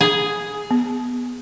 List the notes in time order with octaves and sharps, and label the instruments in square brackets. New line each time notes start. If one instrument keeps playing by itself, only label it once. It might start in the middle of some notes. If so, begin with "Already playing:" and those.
[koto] G#4
[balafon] B3